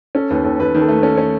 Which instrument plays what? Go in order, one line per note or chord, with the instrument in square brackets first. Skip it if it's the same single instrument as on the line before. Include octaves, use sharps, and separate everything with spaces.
[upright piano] C#4 [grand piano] A4
[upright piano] D#2 [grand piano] B4
[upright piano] D#2 [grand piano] A4
[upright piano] D#2 [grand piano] B4
[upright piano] D#3
[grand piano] A4
[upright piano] A3
[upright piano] C#4 [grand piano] A4
[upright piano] C#4